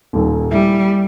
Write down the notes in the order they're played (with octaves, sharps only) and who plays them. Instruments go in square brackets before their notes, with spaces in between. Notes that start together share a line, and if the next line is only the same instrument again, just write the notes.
[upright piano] D#1 D#2
[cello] G3 [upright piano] E4